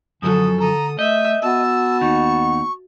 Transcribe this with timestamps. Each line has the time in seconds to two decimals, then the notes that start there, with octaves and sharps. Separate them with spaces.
0.22 F#2 D3 F3 F#3 A4 D#6
0.60 D3 A4 A#5 D#6
0.99 A3 D#5 E5 G6
1.42 B3 F#4 A5 E6
2.01 D#2 D#4 C#6